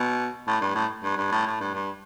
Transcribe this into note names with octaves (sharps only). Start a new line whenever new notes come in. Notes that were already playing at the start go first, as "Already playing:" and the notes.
Already playing: B2
A2
G2
A2
G2
G2
A2
A2
G2
G2